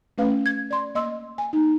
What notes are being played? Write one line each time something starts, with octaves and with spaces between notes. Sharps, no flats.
A3 C#4 B4 F5
G#6
D5 C6
A#3 D#5 C6 E6
G#5
A#3 D#4